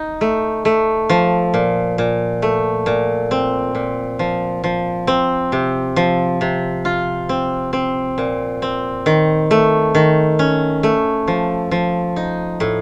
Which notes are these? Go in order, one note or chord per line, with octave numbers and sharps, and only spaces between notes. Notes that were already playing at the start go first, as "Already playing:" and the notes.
Already playing: D#4
A3
A3
F3
A#2
A#2
A3
A#2
C4
A#2
F3
F3
C4
C3
F3
C3
F4
C4
C4
A#2
C4
D#3
A3
D#3
C#4
A3
F3
F3
D#4
A2